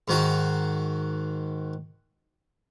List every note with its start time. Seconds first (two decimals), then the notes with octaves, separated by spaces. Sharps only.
0.08 G#2 D#3 F#4